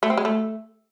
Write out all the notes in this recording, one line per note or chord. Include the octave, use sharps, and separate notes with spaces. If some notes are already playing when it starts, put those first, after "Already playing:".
A3
C4
G#3
A3